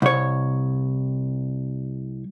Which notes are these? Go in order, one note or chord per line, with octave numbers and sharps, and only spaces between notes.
C2 C#5